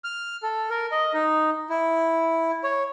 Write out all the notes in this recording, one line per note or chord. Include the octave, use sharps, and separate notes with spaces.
F6
A4
A#4
D#5
D#4
E4
C#5